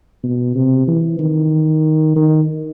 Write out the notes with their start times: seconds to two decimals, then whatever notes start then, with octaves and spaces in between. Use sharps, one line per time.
0.24 B2
0.55 C3
0.88 E3
1.19 D#3
2.16 D#3